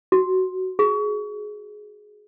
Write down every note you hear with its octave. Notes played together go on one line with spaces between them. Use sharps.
F#4
G#4